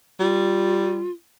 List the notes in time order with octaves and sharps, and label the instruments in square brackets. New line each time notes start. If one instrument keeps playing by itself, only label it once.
[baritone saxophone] G3 [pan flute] F4